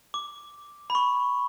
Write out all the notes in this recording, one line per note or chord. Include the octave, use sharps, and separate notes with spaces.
D6
B5
C#6